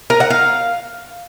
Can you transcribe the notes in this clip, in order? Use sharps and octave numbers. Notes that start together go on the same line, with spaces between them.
A#4
F#5
F5